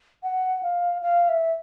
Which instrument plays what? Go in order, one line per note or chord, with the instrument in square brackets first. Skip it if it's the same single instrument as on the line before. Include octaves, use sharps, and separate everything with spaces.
[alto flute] F#5
F5
F5
E5